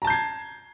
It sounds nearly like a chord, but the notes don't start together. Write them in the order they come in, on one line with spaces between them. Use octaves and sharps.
A#5 A5 G6 C7 G#6